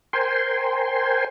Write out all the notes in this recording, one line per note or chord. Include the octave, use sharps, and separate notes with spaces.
A#4 C5 G5 G#5 C6